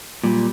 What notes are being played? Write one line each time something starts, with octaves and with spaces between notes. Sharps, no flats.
A#2 G3